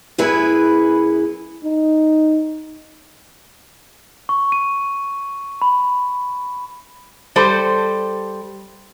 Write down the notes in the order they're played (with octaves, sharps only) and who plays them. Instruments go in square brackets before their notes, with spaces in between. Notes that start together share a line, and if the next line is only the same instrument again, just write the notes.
[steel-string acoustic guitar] F#2 B3 E4 G#4 B4
[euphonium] D#4
[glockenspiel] C#6
D#7
B5
[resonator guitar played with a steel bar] G3 A4 C5